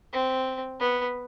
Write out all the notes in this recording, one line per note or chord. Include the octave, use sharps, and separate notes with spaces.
C4
B3